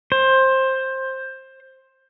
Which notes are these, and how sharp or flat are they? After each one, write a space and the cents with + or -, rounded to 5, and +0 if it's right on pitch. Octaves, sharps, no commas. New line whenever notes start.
C5 +15